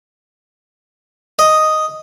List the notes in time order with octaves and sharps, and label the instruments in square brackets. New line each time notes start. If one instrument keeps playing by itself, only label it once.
[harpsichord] D#5